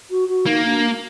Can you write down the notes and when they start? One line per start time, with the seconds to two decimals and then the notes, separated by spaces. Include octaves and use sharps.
0.10 F#4
0.28 F#4
0.46 A#3 D#4
0.65 D4